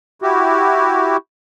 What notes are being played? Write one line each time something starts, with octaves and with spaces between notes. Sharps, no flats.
E4 F#4 G4